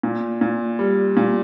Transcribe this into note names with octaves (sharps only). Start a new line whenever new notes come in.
A#2
A#2
G3
A#2